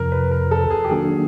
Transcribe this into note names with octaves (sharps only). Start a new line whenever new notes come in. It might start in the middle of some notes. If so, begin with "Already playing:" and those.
Already playing: F2 C3 F3 A#4
B4
A#4
A4
G#4
G4
D#3 F#3 A#3 D4 F#4 G#4